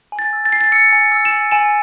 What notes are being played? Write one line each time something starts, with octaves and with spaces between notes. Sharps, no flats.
G#5
A6
E6
A6
G#5 C7
A6
E6 C#7
G#5
E6
E7
G#5
G#5 E7